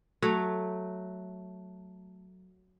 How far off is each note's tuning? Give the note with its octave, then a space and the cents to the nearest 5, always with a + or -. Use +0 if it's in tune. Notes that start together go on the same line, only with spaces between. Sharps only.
F#3 +0 A3 +0